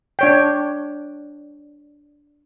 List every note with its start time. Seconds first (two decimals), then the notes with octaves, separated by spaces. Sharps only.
0.19 D4 C#5 G5